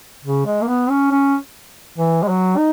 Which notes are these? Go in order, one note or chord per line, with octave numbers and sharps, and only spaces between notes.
C#3
G#3
A#3
B3
C#4
C#4
E3
G#3
F#3
D#4